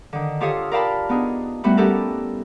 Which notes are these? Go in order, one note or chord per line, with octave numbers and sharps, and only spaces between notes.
D3 D#3
F4 G4 A4 C#5 F5 D#6
A#4 D5 F5 G5 A5 B5
B3 D4 D#4 G#4
G3 A3 B3 E4 F#4
B3 C#4 D4 G4 A4 A#4